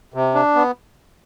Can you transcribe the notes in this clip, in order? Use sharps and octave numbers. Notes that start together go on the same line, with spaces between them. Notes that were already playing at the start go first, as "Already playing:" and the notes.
C3
D4
B3